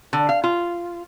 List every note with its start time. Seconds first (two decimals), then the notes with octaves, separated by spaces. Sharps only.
0.13 D3
0.29 F5
0.44 F4